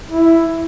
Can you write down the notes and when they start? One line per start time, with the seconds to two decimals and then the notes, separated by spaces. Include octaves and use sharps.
0.09 E4